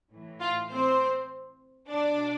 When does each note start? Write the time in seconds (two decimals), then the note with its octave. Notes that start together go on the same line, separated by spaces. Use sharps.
0.11 A2 E3
0.40 F4 F5
0.70 C4 C5
1.89 B2 D4 D5